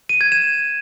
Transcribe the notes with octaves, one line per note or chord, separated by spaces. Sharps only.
D#7
G#6
E7